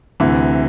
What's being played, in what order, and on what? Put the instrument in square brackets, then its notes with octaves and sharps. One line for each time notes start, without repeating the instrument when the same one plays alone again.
[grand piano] D2 C3 E3